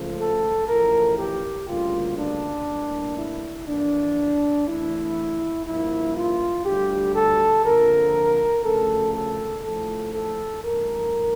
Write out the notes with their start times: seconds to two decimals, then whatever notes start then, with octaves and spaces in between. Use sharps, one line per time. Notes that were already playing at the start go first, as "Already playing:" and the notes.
Already playing: C#2 C#3 F3 A3
0.19 A4
0.68 A1 A2 F3 A#4
1.18 G4
1.68 D2 C#3 G3 A#3 F4
2.18 D4
2.67 A2 G3 A#3
3.17 E4
3.67 F2 E3 A#3 D4
4.67 E2 E3 A3 E4
5.66 G2 F3 A#3 E4
6.16 F4
6.65 D2 D3 G3 G4
7.15 A4
7.65 F2 D3 F3 A#3 A#4
8.65 D2 C#3 F3 A3 A4
9.14 A4
9.64 A#1 A2 F3 A3 A4
10.14 A4
10.64 G2 E3 A3 A#4